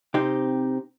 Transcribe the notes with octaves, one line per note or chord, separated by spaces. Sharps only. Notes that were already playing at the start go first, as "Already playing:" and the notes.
C3 C4 D#4 G4